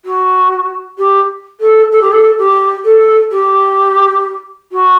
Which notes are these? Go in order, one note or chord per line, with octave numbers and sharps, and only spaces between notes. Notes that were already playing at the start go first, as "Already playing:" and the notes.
F#4
G4
A4
A4
G4
A4
G4
A4
G4
F#4